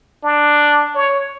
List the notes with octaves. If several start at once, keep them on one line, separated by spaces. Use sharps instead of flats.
D4
C#5